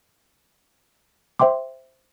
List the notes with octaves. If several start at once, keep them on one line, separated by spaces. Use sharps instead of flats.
C5 E5 G5 C6 D6